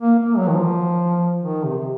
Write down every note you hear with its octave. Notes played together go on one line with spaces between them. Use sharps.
A#3
A#3
F#3
D#3
F3
D#3
C3